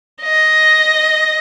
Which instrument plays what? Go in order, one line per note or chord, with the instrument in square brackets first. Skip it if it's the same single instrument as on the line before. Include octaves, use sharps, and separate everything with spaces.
[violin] D#5